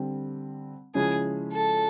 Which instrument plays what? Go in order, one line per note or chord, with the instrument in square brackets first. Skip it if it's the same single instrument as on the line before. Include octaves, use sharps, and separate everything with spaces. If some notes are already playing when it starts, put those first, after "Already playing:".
Already playing: [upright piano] D3 G3 C4
[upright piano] C#3 F3 G#3 C#4 E4 [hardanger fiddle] G#4
[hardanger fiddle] A4